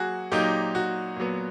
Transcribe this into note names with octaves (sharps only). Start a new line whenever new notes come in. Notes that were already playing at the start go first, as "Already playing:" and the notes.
Already playing: F#3 A#3 F#4 G#4
A#2 F#3 A#3 D#4 G4
F#4
A#2 F#3 B3